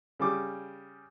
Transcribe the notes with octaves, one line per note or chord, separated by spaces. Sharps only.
C#3 G3 D6